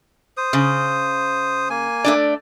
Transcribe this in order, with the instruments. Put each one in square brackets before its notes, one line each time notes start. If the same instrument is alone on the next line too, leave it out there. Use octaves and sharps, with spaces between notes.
[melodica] C5 D#6
[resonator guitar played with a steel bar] C#3
[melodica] A#3 G#5
[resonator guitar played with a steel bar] A3 D4 D5